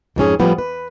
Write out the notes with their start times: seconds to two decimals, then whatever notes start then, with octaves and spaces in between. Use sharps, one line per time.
0.16 F2 G#2 C#4 G#4
0.40 A2 F3 G3 B3
0.58 B4